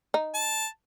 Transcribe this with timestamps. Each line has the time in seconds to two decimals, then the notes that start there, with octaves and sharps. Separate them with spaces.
0.14 D#4
0.35 A5